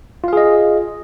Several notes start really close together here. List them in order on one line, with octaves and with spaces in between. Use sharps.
F4 F5 G#4 D#5